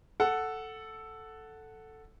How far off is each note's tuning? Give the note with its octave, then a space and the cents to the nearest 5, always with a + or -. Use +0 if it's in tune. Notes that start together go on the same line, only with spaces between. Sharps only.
A4 +0 F#5 +0